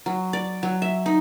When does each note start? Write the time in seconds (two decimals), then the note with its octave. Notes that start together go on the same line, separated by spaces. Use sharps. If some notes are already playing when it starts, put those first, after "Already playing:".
0.06 F#3
0.33 D5
0.63 F#3
0.82 E5
1.06 D#4